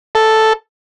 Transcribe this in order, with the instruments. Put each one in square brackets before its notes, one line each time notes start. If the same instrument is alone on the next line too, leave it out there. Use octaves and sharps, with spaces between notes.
[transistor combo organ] A4